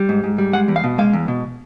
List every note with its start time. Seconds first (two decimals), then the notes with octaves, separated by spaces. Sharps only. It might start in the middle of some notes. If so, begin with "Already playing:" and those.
Already playing: G3
0.09 G#2
0.24 G#2
0.38 G3
0.53 G#3 F#5
0.68 E2
0.76 F5
0.84 B2
0.98 G#3 F5
1.13 E2
1.28 B2